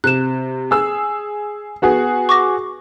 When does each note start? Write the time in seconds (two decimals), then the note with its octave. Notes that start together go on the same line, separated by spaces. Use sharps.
0.04 C3 F#6 E7
0.71 G#4 E6
1.82 B3 F#4 G#4
2.29 C#6 D6 A#6